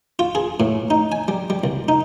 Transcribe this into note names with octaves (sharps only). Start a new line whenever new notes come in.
F4
G#4
A2
D#4
G#5
G3
G3
C2
D#4